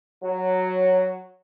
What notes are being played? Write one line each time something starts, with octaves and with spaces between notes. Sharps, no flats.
F#3